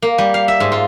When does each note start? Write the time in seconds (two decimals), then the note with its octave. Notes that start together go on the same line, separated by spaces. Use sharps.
0.02 A#3
0.18 G3
0.34 F5
0.48 E5
0.60 G#2
0.72 F4